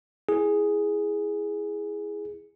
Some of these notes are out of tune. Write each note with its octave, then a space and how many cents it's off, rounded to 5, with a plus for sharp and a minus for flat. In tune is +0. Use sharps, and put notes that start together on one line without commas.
E4 +0 G#4 +0